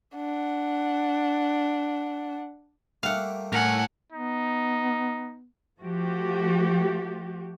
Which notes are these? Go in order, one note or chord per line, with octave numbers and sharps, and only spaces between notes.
D4 F#5
G3 A3 A#3 F5 F#5
A2 A#4 F#5 G#5
B3 D#4
F3 A3 F#4 G4